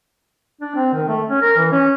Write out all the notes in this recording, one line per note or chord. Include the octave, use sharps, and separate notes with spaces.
D4
C4
D#3
A3
C#4
A#4
E3
C#4